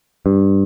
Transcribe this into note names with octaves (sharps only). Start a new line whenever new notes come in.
G2